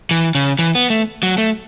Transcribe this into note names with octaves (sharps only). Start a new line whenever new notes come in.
E3
C#3
E3
B3
A3
F#3
A3